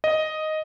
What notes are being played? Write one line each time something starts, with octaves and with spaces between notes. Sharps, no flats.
D#5